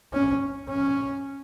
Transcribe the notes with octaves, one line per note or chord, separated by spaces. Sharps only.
C#4
C#4